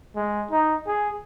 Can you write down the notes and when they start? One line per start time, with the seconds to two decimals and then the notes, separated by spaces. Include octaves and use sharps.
0.16 G#3
0.51 D#4
0.87 G#4